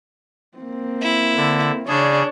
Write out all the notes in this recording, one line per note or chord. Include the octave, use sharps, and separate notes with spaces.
A#3 C4
E4
D3
C#3 D4 G#4 C#5 D5